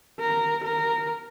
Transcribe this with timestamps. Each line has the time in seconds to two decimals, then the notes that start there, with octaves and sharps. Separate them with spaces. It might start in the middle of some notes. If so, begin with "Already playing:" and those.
0.20 A#4
0.64 A#4